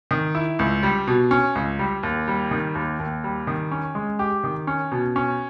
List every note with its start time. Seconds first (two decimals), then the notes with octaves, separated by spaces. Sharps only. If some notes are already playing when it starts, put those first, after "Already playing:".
0.11 D#3
0.35 E4
0.59 C#2
0.83 G3
1.07 B2
1.31 C#4
1.55 C#2
1.79 G3
2.03 D#2
2.28 G3
2.51 D#3
2.75 D#2
2.99 D#2
3.24 G3
3.47 D#3
3.71 C#4
3.95 G#3
4.19 G4
4.44 D#3
4.67 C#4
4.92 B2
5.16 C#4